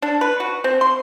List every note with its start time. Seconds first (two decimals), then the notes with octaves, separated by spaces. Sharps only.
0.02 D4
0.21 B4
0.40 F#4
0.64 C4
0.81 C6